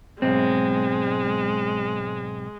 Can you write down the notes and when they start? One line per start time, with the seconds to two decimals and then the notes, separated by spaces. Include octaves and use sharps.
0.22 B1 G#2 G#3 C4